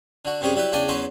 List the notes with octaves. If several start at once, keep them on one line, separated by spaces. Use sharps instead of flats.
D3 F#4
F#2 C3 G3 C#4 G4 G#4
F#3 G3 E4 G4 B4
E2 C#3 D4 D5 G5 G#5
E2 F#3 C#4 B4 C5